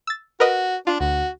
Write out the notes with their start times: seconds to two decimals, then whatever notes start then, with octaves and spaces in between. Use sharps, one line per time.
0.07 E6 A6
0.40 F#4 A#4 B4 D#5
0.87 D4 F4
1.00 D2 F#4